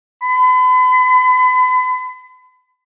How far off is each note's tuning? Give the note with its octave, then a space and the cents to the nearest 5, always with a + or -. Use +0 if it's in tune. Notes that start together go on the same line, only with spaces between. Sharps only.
B5 +40